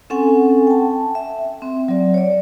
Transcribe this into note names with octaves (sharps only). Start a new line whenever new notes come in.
C4 C#4 A4 F#5 G#5
G5 A5
E5
C4
F#3 D5
C#5 D5